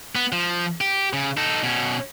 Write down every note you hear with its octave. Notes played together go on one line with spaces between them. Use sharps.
B3
F3
G4
C#3
D#4 A4
B2 C#4